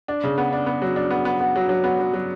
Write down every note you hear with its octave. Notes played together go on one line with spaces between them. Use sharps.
D4
C#3
B3
D4
B3
F#3
D4
B3
B3
B3
F#3
F#3
B3
F#3
F#3